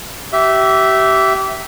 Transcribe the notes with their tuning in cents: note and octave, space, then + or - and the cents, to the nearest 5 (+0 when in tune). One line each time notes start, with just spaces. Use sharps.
G4 -30 E5 +0